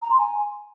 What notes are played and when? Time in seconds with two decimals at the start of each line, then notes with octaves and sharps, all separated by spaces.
0.02 A#5
0.10 C6
0.18 G#5